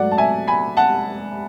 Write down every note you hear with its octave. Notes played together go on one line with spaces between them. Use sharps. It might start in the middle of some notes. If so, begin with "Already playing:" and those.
Already playing: G#2 F#3 A3 D5 F#5
A5
E5 G#5
G#5 B5
F#5 A5